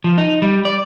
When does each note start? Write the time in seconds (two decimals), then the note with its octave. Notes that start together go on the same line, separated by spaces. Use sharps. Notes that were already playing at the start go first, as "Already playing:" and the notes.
0.04 F3
0.18 D#4
0.42 G3
0.65 D5